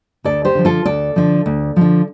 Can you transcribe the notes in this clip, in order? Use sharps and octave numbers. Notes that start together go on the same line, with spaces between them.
D2 A4 D5
G4 C5
D3 F3
F4 A4
D2 A4 D5
D3 F3
D2
D3 F3